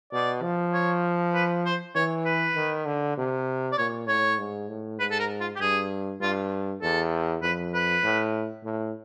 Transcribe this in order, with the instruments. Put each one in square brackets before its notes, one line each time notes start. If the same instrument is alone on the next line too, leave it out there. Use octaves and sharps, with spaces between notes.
[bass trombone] B2 [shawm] D5
[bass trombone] F3
[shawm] C#5
B4
C5
[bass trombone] E3 [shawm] C#5
[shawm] B4
[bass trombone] D#3
D3
C3
[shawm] D5
[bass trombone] A#2 [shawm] C#5
[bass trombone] A2 [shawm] C#5
[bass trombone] G#2
A2
[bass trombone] G#2 [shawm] B4
[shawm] A4
A#4
F4
G4
[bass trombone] G2 [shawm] G#4
[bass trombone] G2 [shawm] F4
[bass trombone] E2 [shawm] A4
[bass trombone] F2 [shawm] B4
[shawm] B4
[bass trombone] A2
A2